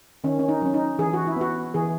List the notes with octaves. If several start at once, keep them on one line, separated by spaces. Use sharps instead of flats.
D#3 C#4
C#4
D#4
F#3 C#4
D#4
E3 G#4
F#4
E4
B3 F#4
E3 G#4